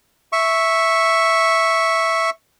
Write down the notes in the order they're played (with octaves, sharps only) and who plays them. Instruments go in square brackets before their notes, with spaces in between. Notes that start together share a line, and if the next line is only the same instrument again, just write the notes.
[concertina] E5 C#6